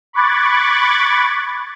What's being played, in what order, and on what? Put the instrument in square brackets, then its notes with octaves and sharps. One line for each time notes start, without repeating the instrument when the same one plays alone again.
[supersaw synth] B5 C#6 D6 F#6 G#6 A6